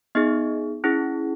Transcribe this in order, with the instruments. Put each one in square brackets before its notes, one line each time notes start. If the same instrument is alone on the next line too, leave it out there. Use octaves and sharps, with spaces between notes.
[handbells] B3 D#4 G#4 D#5
C#4 E4 G#4